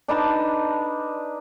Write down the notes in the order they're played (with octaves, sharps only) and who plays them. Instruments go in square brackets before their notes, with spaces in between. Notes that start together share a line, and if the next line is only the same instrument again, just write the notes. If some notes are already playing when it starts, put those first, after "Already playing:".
[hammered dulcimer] D4 D#4 B4 A5